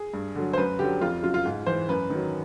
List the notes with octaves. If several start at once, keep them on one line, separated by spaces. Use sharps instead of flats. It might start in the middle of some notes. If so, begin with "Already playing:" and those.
Already playing: G#4
G2
D3 F#3
C5
F#2 B4
D3 F#3 G4
F2 F4
C#3 F#3 F4
F4
G#2
E3 C5
F#2 B4
D#3 F#3